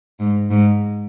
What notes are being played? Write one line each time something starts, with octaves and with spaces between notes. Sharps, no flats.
G#2
G#2